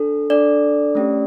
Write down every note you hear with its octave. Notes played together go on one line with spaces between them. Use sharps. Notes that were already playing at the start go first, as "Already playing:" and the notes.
Already playing: D4 A4
D4 A4 D5
A3 C#4 G4